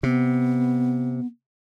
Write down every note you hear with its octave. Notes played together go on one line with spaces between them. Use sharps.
C3 B3